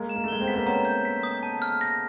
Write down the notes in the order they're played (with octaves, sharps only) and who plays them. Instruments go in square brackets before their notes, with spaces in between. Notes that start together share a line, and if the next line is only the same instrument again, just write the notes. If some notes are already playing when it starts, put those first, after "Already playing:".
Already playing: [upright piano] G#3 A#3
[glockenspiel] E7
[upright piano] A#3
A3
[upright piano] G#3 A#3 [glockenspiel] G7
[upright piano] C4
[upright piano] B3 [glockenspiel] B6
[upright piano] A#3 C4
[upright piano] B3 C#4 [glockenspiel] A#5
[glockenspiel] G6
B6
D#6
A5
F6
A#6